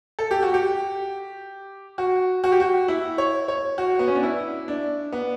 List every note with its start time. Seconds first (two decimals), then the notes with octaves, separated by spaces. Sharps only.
0.19 A4
0.31 G4
0.43 F#4
0.54 G4
1.98 F#4
2.44 F#4
2.52 G4
2.60 F#4
2.88 E4
3.18 C#5
3.48 C#5
3.78 F#4
3.99 B3
4.08 C#4
4.15 D4
4.23 E4
4.68 D4
5.13 B3